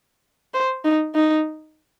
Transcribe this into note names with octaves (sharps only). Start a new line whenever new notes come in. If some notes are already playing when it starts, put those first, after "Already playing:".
C5
D#4
D#4